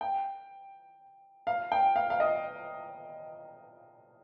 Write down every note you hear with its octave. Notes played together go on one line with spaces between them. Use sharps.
G5
F5
G5
F5
F5
D#5